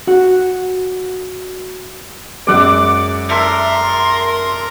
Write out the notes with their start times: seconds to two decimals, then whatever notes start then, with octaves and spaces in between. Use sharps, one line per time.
0.07 F#4 F#5
2.47 F#2 G#3 D5 F#5 D6
3.30 A4 A#4 E5 C6